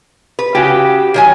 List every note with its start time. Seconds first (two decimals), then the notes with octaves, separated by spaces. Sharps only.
0.39 B4
0.55 C#3 F#4 G4
1.14 D#3 F#3 G#5